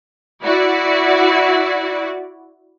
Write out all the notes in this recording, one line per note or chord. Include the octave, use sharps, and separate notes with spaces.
E4 F#4 D5